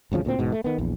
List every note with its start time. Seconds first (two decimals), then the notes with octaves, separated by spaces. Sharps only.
0.12 G#1 D2 C#3 F3
0.25 D2 A#2 C4
0.39 E1 G#2 B2
0.52 A3
0.64 D#3 B3
0.78 A#1 E2